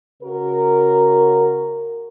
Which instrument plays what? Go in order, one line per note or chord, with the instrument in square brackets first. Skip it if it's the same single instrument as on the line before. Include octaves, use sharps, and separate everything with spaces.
[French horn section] C#3 F#4 A#4